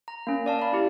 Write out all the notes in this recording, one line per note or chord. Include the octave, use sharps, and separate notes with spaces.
A#5
A#3 C#4
D5 F5 A5
F5 B5
E4 G4